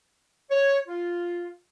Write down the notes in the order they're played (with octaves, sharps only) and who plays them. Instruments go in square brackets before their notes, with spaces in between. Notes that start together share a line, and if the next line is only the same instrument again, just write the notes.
[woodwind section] C#5
F4